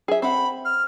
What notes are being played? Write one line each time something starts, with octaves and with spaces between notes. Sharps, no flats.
G#4 E5
C4 F#5 B5
F6